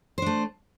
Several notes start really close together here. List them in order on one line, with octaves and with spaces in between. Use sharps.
C5 D4 A3